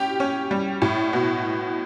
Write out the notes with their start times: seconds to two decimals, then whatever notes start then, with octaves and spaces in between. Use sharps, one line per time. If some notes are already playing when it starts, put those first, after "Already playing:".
Already playing: A2 C#4 G4
0.20 C#4
0.51 G3
0.82 A2
1.13 B2